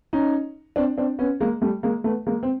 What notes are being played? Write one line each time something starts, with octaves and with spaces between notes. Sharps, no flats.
C#4 D#4
C4 D4
C4 D4
B3 C#4
G#3 A#3
G3 A3
G#3 A#3
A3 B3
G#3 A#3
C4